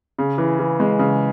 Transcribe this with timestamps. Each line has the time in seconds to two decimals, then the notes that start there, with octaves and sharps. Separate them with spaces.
0.19 C#3
0.38 E3
0.59 E3
0.80 G#3
0.99 C#3